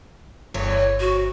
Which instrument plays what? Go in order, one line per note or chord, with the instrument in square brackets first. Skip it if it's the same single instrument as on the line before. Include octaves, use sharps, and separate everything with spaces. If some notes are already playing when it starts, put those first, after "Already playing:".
[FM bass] G1 [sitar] E2 A2 E3 [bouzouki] C#5
[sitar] C3 [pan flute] F#4